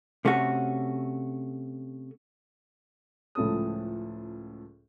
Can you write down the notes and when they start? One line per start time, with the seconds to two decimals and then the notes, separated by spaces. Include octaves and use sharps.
0.25 C3 A3 C#4 F#4
3.35 C#2 A2 F3 C#4 A4 D#6